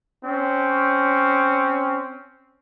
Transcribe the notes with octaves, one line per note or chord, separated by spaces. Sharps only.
C4 C#4